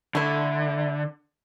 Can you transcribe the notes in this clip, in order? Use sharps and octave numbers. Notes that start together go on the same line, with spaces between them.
D3 A3 E4